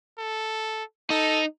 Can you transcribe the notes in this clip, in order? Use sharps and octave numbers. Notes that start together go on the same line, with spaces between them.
A4
D#4 A4